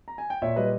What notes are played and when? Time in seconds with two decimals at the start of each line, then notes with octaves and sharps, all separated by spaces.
0.08 A#5
0.18 G#5
0.30 G5
0.42 A#2 C#5 E5
0.56 G3 B4 D#5